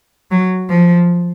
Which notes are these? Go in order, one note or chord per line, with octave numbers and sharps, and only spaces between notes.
F#3
F3